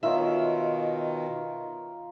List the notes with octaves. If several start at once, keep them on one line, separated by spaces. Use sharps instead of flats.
B2 D#3 D#4 F4 C#5 E5